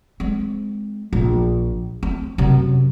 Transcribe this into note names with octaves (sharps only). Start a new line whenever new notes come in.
G#3 C4
A#1
C4
F#2 C3